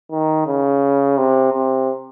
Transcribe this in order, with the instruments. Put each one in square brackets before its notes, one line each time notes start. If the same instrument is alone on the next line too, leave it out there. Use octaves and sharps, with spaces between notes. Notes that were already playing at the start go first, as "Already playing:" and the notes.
[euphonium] D#3
C#3
C3
C3